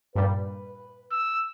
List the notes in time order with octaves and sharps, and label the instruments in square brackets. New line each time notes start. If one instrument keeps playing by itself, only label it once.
[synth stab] G2 A#2 G3 [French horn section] B4
[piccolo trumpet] E6